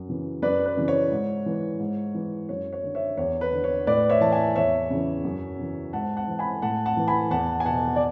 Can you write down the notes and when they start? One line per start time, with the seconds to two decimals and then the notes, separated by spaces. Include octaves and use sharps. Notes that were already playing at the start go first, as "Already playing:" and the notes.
Already playing: F#2
0.09 C#3 E3
0.42 F#2 B4 D5
0.66 B4
0.77 C#3 E3
0.88 C#5
1.11 G#2
1.46 E3
1.80 G#2
2.15 E3
2.49 F#2 C#5
2.73 C#5
2.84 D3
2.95 C#5 E5
3.18 E2 C#5
3.41 B4
3.53 D3
3.64 C#5
3.87 A2 B4 D5
4.10 C#5 E5
4.21 E3 A5
4.32 E5 G#5
4.55 E2 C#5 E5
4.90 C#3 E3
5.24 F#2
5.59 C#3 E3
5.93 G#2 F#5 A5
6.16 F#5 A5
6.28 E3
6.39 G#5 B5
6.62 A2 F#5 A5
6.86 F#5 A5
6.97 E3
7.08 G#5 B5
7.30 E2 F#5 A5
7.60 G#5
7.65 B2 F#5 A5
7.96 D5